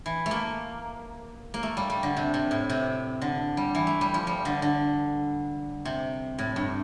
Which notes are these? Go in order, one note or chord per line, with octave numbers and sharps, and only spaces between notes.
E3
A3
A#3
A#3
A3
G3
G3
D3
C3
C3
A2
C3
D3
G3
E3
A3
G3
F3
G3
D3
D3
C3
A2
G2